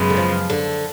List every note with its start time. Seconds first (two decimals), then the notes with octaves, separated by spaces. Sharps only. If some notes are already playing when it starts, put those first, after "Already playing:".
Already playing: F#2 C#3 G#3 B3
0.10 D3
0.17 F3
0.50 D3